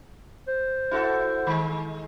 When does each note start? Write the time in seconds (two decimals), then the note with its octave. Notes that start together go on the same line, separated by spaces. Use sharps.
0.48 C5
0.91 E4 F#4 A4
1.47 D#3 G#3